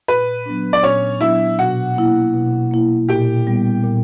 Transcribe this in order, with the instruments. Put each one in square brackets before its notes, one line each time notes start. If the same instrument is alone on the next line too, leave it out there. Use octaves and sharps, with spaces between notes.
[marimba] A#2 [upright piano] B4
[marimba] F#3 B3 D4
[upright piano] D5
[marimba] A#2 [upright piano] C#4 C#5
[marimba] F#3 B3 D4 [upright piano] E4 E5
[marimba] B2 [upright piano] F#4 F#5
[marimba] A#3 E4
B2
A#3 E4
[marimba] A#2 [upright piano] G4 G5
[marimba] G3 B3
A#2